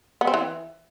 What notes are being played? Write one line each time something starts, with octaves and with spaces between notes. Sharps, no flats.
B3
C4
E3